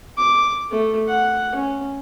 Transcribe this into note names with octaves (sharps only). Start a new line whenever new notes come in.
D6
A3
F#5
C#4